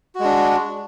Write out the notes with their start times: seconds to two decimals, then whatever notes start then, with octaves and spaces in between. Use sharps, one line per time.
0.15 F#4
0.20 G#3
0.25 D4